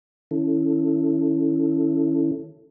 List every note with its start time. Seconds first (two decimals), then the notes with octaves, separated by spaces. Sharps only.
0.31 D#3 C#4 E4 A4